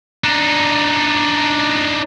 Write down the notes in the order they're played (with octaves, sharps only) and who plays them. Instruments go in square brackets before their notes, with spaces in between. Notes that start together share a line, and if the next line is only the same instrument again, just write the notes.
[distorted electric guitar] D4 D#4